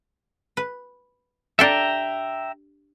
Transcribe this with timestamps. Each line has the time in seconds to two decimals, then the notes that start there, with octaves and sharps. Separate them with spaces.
0.57 B4
1.59 D4 G4 A4 E5 G5 A#5